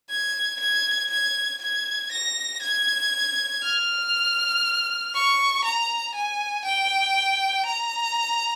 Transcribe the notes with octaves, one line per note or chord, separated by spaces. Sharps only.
G#6
G#6
G#6
G#6
A#6
G#6
F6
C#6
A#5
G#5
G5
A#5